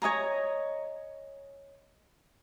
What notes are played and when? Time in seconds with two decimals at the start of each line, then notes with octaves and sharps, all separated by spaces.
0.02 C#5 D#5 G#5 A#5